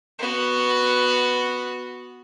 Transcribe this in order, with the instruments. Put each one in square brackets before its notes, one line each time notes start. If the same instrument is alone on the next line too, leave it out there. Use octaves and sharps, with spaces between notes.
[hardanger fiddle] B3 F#4